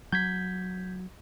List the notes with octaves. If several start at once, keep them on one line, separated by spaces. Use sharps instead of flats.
F#3 G6 G#6 B6